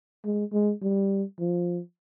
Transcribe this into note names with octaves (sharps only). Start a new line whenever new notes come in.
G#3
G#3
G3
F3